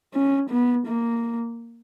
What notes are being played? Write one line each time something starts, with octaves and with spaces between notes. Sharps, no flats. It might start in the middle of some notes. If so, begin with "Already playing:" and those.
C#4
B3
A#3